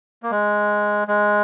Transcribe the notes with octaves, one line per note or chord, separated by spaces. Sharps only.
A#3
G#3
G#3